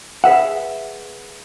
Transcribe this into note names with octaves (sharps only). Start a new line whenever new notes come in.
G#4 B4 E5 F#5